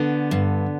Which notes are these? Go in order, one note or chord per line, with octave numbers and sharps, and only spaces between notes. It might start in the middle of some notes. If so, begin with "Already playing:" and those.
Already playing: D3 B3 D4
G2